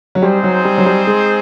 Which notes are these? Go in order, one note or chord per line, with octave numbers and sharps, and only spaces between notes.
F#3
G3 C4 D#4 G#4 C5
F#3
G3
F#3
G3
G#3